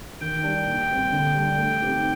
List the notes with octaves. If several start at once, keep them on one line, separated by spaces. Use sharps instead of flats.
D#3 G5
G3 D4
A#2
G3 C4
D3
G3 D4
A3
C4 D#4 G4